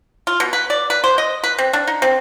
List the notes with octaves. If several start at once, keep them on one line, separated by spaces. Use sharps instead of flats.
F4
B2
B4
D5
B4
C5
D#5
B4
C4
D4
D#4
C4